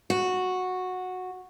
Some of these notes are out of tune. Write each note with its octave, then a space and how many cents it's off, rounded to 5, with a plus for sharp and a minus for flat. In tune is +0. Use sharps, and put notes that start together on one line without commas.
F#4 -10